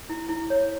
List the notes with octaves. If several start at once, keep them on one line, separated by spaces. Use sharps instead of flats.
E4
E4
C#5